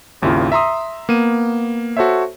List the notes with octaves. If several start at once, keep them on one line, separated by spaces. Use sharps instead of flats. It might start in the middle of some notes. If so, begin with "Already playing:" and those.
G#1 D#2 C#3 E4 F4
E5 A#5 C6 D#6
A#3 B3 D#7
F#4 A4 C5 C#5 E5